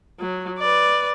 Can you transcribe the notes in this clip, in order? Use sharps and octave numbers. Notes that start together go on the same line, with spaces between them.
F#3
B4 D5